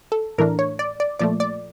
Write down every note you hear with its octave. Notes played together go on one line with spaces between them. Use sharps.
A4
A2 E3 A3 D4 A#4
C#5
D5
D5
A#2 F3 A3 D5
D5